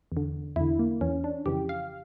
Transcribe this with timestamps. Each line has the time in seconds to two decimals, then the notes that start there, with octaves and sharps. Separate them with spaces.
0.12 E2
0.17 D3
0.56 E2 D3 E4
0.79 A#3
1.01 E2 E3 C#4
1.24 D4
1.46 F2 C#3 E3 G4
1.69 F5